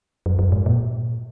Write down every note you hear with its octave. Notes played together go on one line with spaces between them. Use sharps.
F#2
F#2
G#2
A#2